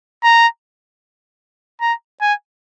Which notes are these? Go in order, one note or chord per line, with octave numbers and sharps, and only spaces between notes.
A#5
A#5
G#5